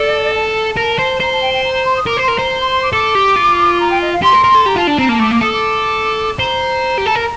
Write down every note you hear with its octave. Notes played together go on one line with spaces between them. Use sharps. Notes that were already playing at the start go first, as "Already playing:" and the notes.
Already playing: A4 D5
A5
A#4
C5
C5 A#5
A5
G5
G5
A#5
A#5
C6
D#6
A#4 D6
C5 C6
A#4
C5 A#5
A#5
C6
C6
D6
A4 D6
G4
F4
A#5
G5
D#5
F5
G4 C6
A#4
A#4
A4
G4 A#5
F4 A5
D4 A5
C4 A#5
A#3 A5
A3 D6
A#3 D6
A4 D#6
D6
C5 A#5
G4
A4
A#4